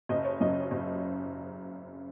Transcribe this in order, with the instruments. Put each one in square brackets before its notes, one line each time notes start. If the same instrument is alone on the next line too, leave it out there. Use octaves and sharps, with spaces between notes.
[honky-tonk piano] F#1 D#5
C#5
F#2 C#3 D#5
F#1